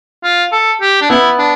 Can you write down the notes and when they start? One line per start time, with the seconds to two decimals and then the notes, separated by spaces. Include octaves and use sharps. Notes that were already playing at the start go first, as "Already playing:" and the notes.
0.24 F4
0.52 A4
0.81 G4
1.01 D4
1.10 B3 E4
1.39 D4